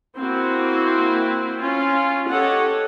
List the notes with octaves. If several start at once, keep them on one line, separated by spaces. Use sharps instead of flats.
A#3 C4 E4 F#4
C#4 F4
G4 A4 C#5 D#5 F#5